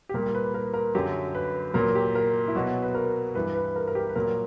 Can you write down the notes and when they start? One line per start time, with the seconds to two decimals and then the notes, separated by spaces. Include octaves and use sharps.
0.09 G4
0.14 A#2 G3 A#4
0.35 B4
0.54 A#4
0.74 A#4
0.95 F#2 D3 F#3 G4
1.35 B4
1.74 A#2 F#3 A#4
1.95 G4
2.15 A#4
2.48 E4
2.55 B2 F#3 F#4
2.83 B4
2.95 A#4
3.35 G2 E3 G3 B4
3.55 B4
3.76 A#4
3.87 A#4
3.95 G4
4.09 B4
4.16 A#2 F#3 A#4